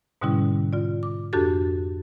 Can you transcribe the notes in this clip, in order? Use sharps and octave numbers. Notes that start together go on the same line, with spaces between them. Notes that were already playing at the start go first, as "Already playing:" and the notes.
G#2 B2 D3 G3 C#4 E4
F4 D5
D6
F2 D4 F#4 G4 A4 A6